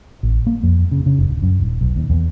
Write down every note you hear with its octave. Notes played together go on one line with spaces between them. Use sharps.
A1
A#3
F2
C#3
C#3
F1
D1
F#2
D#1
B1
D#2
E2